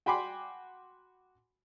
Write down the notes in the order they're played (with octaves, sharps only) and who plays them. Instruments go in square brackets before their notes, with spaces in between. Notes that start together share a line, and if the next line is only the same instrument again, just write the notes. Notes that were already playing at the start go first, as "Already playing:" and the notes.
[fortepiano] F#4 G5 G#5 B5 C6 D6